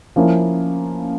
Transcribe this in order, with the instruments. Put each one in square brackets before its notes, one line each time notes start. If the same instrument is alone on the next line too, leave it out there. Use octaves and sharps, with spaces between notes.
[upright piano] F3 A#3 C#4 E4